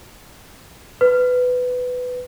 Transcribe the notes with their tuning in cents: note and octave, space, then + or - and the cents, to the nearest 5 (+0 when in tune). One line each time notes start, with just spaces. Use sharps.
B4 +15